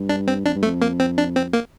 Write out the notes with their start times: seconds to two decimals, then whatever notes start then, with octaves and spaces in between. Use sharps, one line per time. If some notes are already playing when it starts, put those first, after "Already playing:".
Already playing: G2
0.09 D4
0.28 C4
0.45 F2 D4
0.55 G2
0.63 A3
0.66 F2
0.82 A#3
1.00 C4
1.18 D4
1.36 C4
1.53 A#3